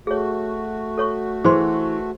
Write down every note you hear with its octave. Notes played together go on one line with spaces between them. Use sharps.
A3 F#4 G#4 C#5
A4 C#5 C#6
E3 G#4 C5 C6